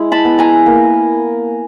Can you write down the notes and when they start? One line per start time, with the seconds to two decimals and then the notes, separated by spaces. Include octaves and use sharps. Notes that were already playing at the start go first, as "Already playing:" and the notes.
Already playing: G#3 E4
0.12 A5 B5
0.25 B3
0.39 G#5 A#5
0.66 A#3